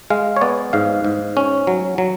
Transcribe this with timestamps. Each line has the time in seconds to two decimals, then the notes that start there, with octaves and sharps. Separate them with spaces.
0.10 G#3 F5
0.37 C#5
0.41 B3 D5
0.73 G#2 F5
1.05 G#2
1.37 C#4
1.67 F#3
1.98 F#3